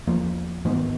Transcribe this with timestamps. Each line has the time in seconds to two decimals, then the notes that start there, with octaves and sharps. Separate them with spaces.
0.07 E2 F3 A#3
0.65 G#2 D#3 B3